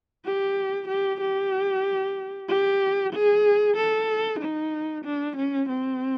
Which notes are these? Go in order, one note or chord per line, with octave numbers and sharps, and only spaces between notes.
G4
G4
G4
G4
G#4
A4
D#4
D4
C#4
C4